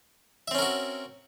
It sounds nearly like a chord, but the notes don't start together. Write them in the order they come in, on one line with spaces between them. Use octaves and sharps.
E5 C4 C#4 A#4 F#4